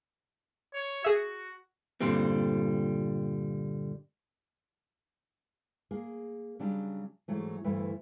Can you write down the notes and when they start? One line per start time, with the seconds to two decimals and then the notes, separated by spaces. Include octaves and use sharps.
0.74 C#5
1.04 F#4 G#4 E5
2.01 G2 A#2 D3 G3 C4
5.91 A#3 G#4
6.59 C#3 F#3 G3 D4
7.28 G#2 E3 F#3 A3
7.64 D2 G2 E3 A3 E4